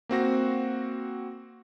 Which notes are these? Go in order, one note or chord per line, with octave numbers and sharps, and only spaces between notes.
A#3 C4 F#4 A#6